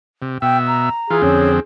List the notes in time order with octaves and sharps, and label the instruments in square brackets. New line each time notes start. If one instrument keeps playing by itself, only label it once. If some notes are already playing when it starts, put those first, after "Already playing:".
[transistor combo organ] C3
[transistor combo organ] B2 E5 [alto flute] G5
[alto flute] A#5
[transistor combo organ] E3 F4 [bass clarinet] G#4
[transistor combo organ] F2 D3 C4 [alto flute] C#4